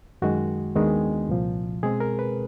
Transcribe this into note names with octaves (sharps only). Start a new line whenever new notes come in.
F#2 D#3 G#3 F#4
D#2 D#3 G#3 B3 D4
C2 A#2 F3
B2 G#3 C4 G#4
A#4
B4